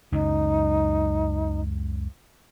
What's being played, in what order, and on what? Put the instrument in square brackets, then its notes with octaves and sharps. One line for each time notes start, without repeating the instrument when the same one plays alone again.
[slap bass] C#2 F#2 [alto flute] D#4